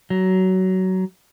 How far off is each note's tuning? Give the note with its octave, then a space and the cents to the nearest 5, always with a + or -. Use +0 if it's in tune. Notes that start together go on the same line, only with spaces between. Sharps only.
F#3 +20